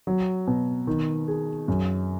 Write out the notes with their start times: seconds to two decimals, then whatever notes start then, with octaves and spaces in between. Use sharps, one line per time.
0.07 F#3
0.47 B2
0.87 D#3
1.28 G#4
1.68 F#2